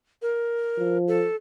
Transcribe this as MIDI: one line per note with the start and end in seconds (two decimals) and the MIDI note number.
0.22 0.98 70
0.78 1.26 53
1.08 1.36 69